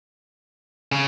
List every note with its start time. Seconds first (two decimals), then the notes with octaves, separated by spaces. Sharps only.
0.92 C#3